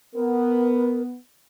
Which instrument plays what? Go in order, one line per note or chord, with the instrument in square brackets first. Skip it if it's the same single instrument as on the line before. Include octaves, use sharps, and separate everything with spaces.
[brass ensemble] B3 [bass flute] A#4